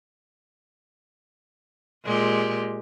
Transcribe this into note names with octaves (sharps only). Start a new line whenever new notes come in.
A#2 G#3 G4